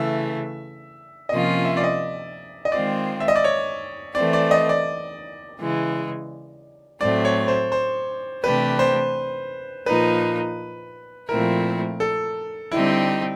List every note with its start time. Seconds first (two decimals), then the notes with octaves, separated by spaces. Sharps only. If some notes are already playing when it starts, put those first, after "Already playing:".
Already playing: C#3 E3 A3 E5
1.29 C3 F3 A#3 C#4 F4 D#5
1.65 E5
1.77 D5
1.84 D#5
2.65 D#5
2.72 D#3 G#3 C4 F4 D5
3.20 E5
3.28 D#5
3.36 D5
3.44 C#5
4.15 E3 A3 C4 D5
4.33 D5
4.51 D#5
4.69 D5
5.58 C#3 E3 G#3
7.00 A2 F#3 A3 C4 D5
7.25 C#5
7.48 C5
7.72 C5
8.43 C3 E3 A3 D4 G4 B4
8.79 C5
9.86 A#2 F3 A#3 D#4 B4
11.29 A#2 F3 A3 C4 E4 A#4
12.00 A4
12.72 D3 G3 C4 D#4 E4 G4